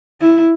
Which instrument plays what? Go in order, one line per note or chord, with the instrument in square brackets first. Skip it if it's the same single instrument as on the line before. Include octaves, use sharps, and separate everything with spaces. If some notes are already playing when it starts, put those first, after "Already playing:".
[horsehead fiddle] E4